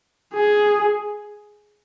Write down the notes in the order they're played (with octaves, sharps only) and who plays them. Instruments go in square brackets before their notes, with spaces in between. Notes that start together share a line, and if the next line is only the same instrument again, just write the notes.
[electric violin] G#4